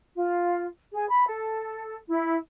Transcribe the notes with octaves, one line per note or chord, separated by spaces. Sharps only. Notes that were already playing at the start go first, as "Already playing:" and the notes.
F4
G#4
B5
A4
E4